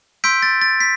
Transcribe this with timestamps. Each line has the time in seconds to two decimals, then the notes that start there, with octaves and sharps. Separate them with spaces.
0.24 C6 E6 G6 B6 D7
0.43 A6
0.61 A6
0.80 B6